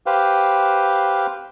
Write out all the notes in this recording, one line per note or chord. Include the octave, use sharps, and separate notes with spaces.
G4 B4 C5 F5 G5